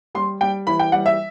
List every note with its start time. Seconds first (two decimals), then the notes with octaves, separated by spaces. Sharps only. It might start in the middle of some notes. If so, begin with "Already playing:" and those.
0.15 G3 C6
0.41 G3 G5
0.67 E3 B5
0.79 G5
0.92 G3 F#5
1.06 E5